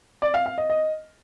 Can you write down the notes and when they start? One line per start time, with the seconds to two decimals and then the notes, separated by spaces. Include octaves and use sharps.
0.22 D5
0.34 F5
0.46 F5
0.58 D#5
0.70 D#5